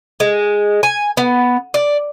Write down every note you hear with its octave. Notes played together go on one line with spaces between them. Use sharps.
G#3
G#5
B3
D5